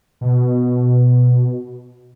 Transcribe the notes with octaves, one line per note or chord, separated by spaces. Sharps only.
B2